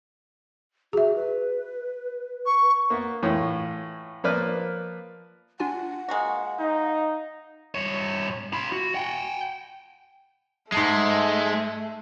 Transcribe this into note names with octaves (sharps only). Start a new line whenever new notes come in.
F#4 G#4 E5
B4
C#6
A#3 B3
A2 E3 F4 C#5
F3 A#3 B4 D5 F6
D4 F4 F#5 G#5
G#3 A#3 F#4
D#4 F5
G2 C#5
F4 B5
F#4
F#5 G5
G#2 G#3 A3 A5 C7